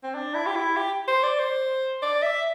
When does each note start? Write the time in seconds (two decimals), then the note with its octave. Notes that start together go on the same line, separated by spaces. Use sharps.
0.03 C4
0.15 D4
0.35 E4
0.46 G4
0.56 E4
0.77 G4
1.08 C5
1.23 D5
1.39 C5
2.02 D5
2.22 E5